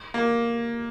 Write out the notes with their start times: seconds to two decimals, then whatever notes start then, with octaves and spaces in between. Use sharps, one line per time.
0.14 A#3